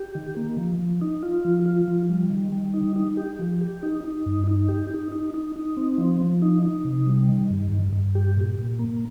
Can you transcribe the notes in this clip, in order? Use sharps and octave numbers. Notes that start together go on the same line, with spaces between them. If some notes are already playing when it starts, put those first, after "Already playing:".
Already playing: G4
D#3
A#3
F3
F3
D#4
F4
F3
F4
F3
G3
D#3
G3
D#4
D#4
G4
F3
G4
D#4
D#4
G2
D#4
G4
D#4
D#4
D#4
D#4
C4
F3
F3
D#4
D#4
C3
G3
D#3
G2
G2
G2
G4
A#2
A#2
A#3